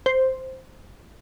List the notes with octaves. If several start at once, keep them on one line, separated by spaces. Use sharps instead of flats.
C5